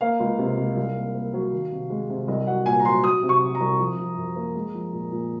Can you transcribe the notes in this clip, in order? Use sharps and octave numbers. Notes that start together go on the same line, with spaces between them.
A#3 F5
C#2
C3
C#2
C2
A#3
A#3
F#3
D#3
C3
G#3
C3
C2 D#5
F#3 F#5
A#2 G#5
A#5
F#3 C6
F#3 D#6
C3
C#6
F#3
A#5
C2
F3
F3
F#2
A#3
G#3
F3
A#2
A#2